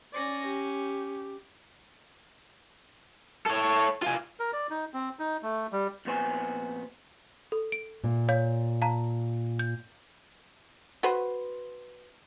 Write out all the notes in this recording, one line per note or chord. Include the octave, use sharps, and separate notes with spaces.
C#4 D5 A#6
G4
A4 C#5
F4 G#5
A#4
D5
D#4
C4
D#4
A3
G3
F2 A#2 B3 C5 G#5 C6
A4
D7
A#2
C#5 F5 G6
F5 A5 A#5
G6
F#4 B4 C5